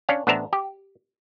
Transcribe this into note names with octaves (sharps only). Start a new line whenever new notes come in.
C#4 D4 C#5 F5
A1 B3 D4 C5 E5 A#5
G4